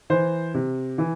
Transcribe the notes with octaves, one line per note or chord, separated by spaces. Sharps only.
E3 C5
C3
E3